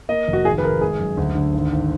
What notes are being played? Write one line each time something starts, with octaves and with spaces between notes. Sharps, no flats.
A#3 D#5
F1
F#4
G#1 G#4
B4
G#1 A#4
G#3 G#4
F#2
D2
D3
G#1
G#1